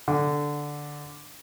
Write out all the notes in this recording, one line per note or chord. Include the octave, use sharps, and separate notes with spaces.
D3